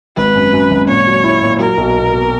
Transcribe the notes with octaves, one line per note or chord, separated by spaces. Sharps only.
G#1 B4
F#2
F#2
G#1
A#2 C#5
F#3
E4
A#2
F#3 A#4
B1
B2
B2